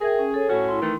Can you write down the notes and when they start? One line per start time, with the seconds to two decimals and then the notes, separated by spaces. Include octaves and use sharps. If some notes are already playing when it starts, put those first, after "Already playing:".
0.01 G#4 A#4 E5 G5
0.19 C#4
0.34 A4 C#5
0.50 A2 C#4 F#4 C#6
0.68 E4 C6
0.82 D#3 E3 A3